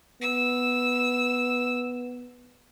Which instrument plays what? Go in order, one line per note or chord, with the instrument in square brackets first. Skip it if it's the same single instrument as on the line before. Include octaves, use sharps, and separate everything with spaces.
[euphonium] B3 [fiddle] E6